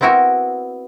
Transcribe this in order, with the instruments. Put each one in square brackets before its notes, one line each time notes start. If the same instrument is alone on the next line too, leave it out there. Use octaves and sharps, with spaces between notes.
[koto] B3 C4 E4 F#4 A#4